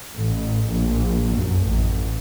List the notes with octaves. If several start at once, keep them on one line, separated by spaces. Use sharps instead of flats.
A1
A#1
F#2
A1